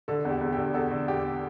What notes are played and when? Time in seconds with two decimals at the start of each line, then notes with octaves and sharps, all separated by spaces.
0.08 D3 A4
0.25 E2
0.30 G4
0.41 E2
0.53 D3 G4
0.74 E2 A4
0.91 D3
1.08 E2 G4